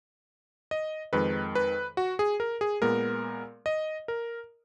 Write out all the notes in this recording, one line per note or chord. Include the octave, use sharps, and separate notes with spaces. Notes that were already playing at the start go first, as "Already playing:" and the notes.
D#5
F2 D#3 G#3 B4
B4
F#4
G#4
A#4
G#4
A#2 G#3 B3 A#4
D#5
A#4